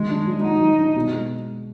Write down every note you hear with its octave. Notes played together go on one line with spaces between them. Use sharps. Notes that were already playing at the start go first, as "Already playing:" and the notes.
Already playing: D#3 F#3 G#3
D4
F#3
D#4 F#4
F#3
D4
B2
G#3